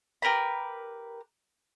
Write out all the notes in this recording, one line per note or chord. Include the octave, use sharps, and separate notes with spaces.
G4 A#4 B4 B5